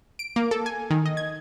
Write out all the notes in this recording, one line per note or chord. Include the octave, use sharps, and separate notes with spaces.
D7
A#3
A4
G#5
D#3
D#5
G#6